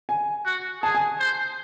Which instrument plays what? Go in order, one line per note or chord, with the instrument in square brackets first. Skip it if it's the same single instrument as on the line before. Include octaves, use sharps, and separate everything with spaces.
[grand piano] G#5
[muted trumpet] F#4
[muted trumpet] G#4 [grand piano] A5
[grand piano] G#5
[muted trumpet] C5